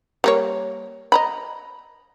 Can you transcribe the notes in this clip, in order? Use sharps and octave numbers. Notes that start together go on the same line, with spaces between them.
G3 A#3 C#5
D#5 A#5 B5